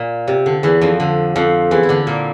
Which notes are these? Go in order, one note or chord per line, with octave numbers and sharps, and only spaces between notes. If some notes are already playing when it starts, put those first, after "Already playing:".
Already playing: A#2
C3
D3
E2 E3
F2 F3
D3
F2 F3
E2 E3
E4
D3 D4
A#2 A#3